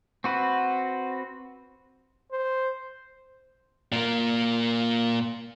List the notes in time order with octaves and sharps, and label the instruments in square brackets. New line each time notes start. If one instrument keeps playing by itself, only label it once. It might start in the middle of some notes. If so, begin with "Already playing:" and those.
[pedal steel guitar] C4 F#4 B4
[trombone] C5
[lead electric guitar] A#2 A#3